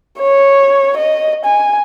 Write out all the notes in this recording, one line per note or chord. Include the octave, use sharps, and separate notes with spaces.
C#5
D#5
G#5